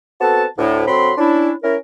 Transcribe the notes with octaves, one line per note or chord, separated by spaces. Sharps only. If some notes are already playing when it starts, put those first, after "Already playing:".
B3 C4 F#4 A4 F#5 A5
D2 A2
D3 F#3 C4 B5 C6
C#4 D4 E4
C#4 E4 A#4